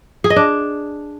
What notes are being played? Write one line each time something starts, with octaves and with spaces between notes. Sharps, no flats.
G#4
D#5
D4